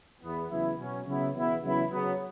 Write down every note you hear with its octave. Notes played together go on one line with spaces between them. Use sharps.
E2 E3 B3
E2 C#3 F#3 B3 E4
B2 F#3 C#4
C#3 F#3 B3 E4
E2 B2 B3 E4
E2 C#3 F#3 B3 E4
C#3 F#3 B3